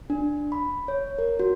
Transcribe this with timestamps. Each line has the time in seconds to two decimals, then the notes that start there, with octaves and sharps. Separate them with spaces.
0.10 D4
0.52 B5
0.88 C#5
1.18 A#4
1.39 F#4